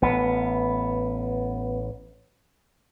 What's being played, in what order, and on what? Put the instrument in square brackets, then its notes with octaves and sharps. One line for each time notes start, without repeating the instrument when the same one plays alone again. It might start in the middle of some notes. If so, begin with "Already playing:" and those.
[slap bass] A1 [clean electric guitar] B3